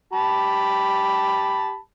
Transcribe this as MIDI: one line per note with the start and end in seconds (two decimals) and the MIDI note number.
0.13 1.77 67
0.13 1.77 81
0.13 1.77 83